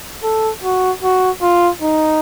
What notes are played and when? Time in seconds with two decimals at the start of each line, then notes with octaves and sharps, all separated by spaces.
0.23 A4
0.64 F#4
1.03 F#4
1.42 F4
1.82 D#4